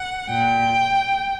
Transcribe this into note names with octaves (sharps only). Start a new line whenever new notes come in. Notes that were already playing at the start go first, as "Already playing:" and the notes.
Already playing: F#5
A#2 G5